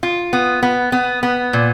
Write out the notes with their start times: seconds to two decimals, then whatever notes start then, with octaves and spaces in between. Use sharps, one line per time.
0.03 F4
0.33 B3
0.63 B3
0.92 B3
1.23 B3
1.53 A#2